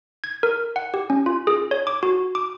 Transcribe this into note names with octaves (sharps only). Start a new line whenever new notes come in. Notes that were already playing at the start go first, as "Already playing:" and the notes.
G#6
A#4
F#5
G4
C#4
F4
G#4
C#5
D6
F#4
D6